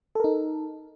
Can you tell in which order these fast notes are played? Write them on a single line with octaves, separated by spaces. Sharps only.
A4 A#4 D#4